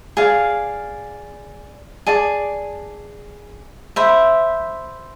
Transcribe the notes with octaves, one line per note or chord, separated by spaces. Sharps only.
G#4 D5 F5
G#4 D5 A5 D6
C5 E5 B5